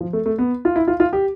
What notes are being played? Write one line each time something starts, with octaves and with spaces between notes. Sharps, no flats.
F3
A3
A3
B3
F4
E4
F4
F4
G4